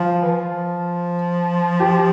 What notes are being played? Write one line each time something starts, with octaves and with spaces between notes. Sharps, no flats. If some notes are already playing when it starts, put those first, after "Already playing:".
Already playing: F3 F4
E3
F3
G4